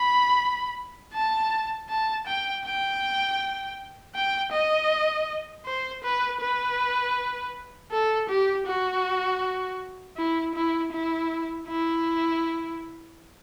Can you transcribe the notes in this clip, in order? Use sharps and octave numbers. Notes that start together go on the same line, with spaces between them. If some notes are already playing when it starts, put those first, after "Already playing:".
Already playing: B5
A5
A5
G5
G5
G5
D#5
C5
B4
B4
A4
G4
F#4
E4
E4
E4
E4